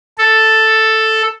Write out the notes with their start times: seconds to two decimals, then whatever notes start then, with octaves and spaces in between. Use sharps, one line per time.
0.18 A4